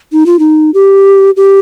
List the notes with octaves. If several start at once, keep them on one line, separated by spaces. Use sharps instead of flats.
D#4
F4
D#4
G4
G4